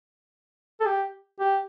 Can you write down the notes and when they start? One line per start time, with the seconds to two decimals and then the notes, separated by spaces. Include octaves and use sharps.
0.80 A4
0.86 G4
1.40 G4